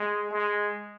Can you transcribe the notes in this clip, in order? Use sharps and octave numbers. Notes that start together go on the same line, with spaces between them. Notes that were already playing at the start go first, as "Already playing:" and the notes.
Already playing: G#3
G#3